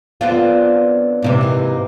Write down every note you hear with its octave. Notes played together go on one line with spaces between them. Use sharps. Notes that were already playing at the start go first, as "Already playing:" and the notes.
D3 F#3 B3 C4 D4 F4
G#2 C3 E3
A#3 D#4